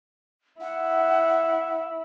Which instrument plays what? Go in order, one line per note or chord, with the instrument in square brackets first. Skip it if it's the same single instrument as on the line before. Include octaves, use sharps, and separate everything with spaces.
[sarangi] E4 [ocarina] F#5